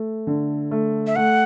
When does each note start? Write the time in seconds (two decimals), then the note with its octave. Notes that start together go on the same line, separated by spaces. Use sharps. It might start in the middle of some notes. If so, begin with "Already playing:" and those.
Already playing: A3
0.27 D3
0.71 A3
1.07 E5
1.16 A3 F#5